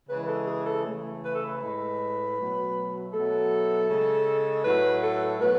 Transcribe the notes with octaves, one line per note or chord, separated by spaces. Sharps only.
C#3 E3 G#3 B4
A4
G#4
A4
C#3 E3 A3
B4
A4
B4
A2 G#3
B2 F#3 A3
B2 F#3 A3 A4
C#3 G#3
A2 F#3 A3 B4
A4
B2 F#3 B4